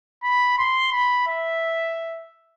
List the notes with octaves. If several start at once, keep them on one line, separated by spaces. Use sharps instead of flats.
B5
C6
B5
E5